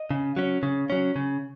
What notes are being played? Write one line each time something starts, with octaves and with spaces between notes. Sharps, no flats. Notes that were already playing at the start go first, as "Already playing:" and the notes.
Already playing: D#5
C#3
F#3 C#4
C#3
F#3 C#4
C#3